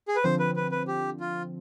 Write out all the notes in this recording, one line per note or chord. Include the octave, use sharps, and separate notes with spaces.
G#4
B4
D3 F3 C4 C5
B4
B4
B4
G4
F4